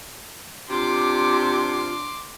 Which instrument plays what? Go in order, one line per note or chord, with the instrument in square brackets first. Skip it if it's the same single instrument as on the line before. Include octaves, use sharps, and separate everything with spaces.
[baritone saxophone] C3 [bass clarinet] D4 [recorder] F4 [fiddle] C6 D6